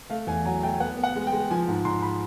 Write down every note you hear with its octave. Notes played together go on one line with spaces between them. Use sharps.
A3 F5
E2 G#5
F#3 G#5
A3 G5
B3 F#5
B3
F#5
G#3
G5
G#3
F3 G#5
G#2
G#2 C6
B5